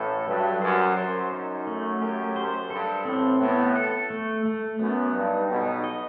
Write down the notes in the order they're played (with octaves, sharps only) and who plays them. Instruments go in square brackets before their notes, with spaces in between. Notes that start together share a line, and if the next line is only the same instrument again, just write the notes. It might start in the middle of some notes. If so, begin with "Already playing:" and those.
Already playing: [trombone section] A1 A2 [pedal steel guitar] A4
[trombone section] G2 [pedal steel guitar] F#3
[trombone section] F#2 [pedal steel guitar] C5
[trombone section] F#2 [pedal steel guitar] C5
[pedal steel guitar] D#4
A3
G4
C5
[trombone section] G2 [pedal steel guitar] A4
[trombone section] A1 A2 [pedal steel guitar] C4
[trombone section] A1 A2 [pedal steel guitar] B3
[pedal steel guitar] A4
A3
A3
[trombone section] F#2 [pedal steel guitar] B3
[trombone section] G2 [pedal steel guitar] D#4
[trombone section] B1 B2 [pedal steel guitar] D#4
[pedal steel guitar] D#5